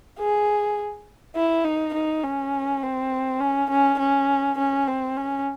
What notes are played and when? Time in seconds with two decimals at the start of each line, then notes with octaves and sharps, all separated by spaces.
0.19 G#4
1.36 E4
1.64 D#4
1.94 D#4
2.24 C#4
2.83 C4
3.40 C#4
3.70 C#4
3.99 C#4
4.58 C#4
4.88 C4
5.17 C#4